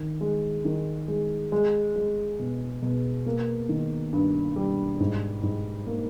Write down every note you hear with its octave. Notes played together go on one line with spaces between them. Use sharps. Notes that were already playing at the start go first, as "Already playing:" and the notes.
Already playing: D#3
G#3
D#3
G#3
G#3
G#3
B2
B2
A#3
D#3
G2
G3
G#2
G#2
A#3